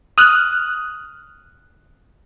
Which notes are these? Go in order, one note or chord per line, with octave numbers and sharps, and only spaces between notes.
D#6 F6 F#6